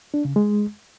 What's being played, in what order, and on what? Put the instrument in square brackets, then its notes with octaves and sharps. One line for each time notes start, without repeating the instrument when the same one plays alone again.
[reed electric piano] D4
C#3
G#3